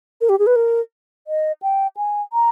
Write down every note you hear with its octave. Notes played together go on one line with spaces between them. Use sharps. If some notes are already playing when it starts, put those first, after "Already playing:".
A#4
G4
G#4
B4
A#4
D#5
G5
G#5
A#5